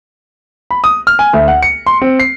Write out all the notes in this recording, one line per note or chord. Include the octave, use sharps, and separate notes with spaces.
B5
D#6
F6
G#5
D2
F#5
C#7
C6
C4
C7